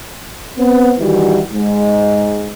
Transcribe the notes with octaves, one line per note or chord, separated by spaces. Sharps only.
B3 C4
D#3 E3 G3 E4 F#4
G#2